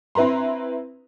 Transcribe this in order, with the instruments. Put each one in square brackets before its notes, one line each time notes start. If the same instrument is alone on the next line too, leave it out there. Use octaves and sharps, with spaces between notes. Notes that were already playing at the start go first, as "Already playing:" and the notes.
[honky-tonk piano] C4 E4 B4 A#5 C6